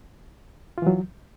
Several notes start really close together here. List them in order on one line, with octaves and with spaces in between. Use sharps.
F4 E3 F#3